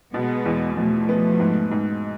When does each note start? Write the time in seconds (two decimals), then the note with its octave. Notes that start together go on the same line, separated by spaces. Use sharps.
0.13 B2 G#3 B3
0.45 E2
0.76 B2 F3 A3
1.09 B3
1.40 G#2
1.71 G#2